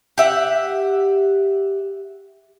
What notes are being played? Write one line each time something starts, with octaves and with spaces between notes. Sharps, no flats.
G4 E5 F#5